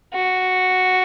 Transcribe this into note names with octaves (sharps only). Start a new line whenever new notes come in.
F#4